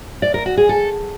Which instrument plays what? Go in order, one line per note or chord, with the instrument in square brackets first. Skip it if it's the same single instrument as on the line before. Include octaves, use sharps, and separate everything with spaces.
[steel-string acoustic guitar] D5
A#4
F#4
G#4
A4